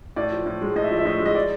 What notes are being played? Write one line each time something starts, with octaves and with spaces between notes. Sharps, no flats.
A2 D5
F3
A2
G#3
A2 D#5
E5
F3 D#5
E5
A2 D#5
G#3
D#5
D5